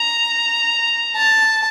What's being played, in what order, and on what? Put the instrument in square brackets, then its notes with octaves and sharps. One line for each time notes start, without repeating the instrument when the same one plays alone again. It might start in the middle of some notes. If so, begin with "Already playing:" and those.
Already playing: [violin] A#5
A5